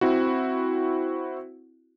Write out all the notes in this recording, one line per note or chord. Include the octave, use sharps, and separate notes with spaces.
C4 E4 F#4